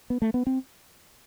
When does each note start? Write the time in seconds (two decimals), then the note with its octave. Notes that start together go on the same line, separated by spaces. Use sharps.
0.10 B3
0.22 A3
0.34 B3
0.47 C4